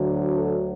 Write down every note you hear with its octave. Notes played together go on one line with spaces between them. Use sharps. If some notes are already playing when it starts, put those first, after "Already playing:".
Already playing: D2 D3 F#3
A4